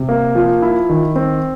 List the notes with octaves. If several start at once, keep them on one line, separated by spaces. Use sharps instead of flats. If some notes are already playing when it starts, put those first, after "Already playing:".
Already playing: C3
A#3
F3
E4
D#3
C4